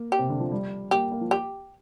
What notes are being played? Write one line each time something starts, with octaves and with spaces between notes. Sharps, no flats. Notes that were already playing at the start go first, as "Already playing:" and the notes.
Already playing: A#3
G4
C3
D3
F3
G3
A#3 G4
A#3
F3
G4